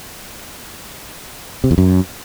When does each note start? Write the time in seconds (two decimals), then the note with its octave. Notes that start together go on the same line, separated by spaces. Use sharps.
1.64 C3
1.71 E2
1.78 F#2